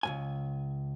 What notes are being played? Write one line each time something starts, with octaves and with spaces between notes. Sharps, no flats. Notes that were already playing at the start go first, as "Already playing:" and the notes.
C#2 G2 G#5